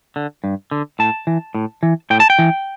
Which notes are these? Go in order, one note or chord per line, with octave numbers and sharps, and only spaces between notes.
D3
G2
D3
A2 A5
E3
A2
E3
A2 G5
A5
G5
E3